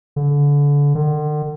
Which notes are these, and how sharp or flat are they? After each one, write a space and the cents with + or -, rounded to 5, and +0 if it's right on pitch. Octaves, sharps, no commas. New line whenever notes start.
D3 -30
D3 +45